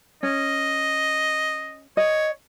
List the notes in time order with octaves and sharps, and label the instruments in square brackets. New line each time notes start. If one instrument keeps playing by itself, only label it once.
[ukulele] C#4 [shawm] D#5
[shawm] C#5 [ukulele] D#5